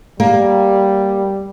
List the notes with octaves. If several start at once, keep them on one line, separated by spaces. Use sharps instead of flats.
G3 A#3